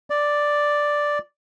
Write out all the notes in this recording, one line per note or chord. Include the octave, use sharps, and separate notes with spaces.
D5